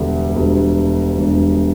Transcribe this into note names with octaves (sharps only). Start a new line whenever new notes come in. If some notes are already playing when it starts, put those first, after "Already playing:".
Already playing: E1 D2 D3 G3
E1 D2 D3 G3
E1 D2 D3 G3